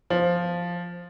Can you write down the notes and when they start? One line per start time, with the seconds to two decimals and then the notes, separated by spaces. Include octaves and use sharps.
0.10 F3